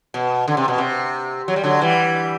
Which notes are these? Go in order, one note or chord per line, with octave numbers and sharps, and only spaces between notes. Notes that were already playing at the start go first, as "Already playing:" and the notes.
B2
D3
C3
B2
C3
F#3
G3
D3 F#3
E3 G3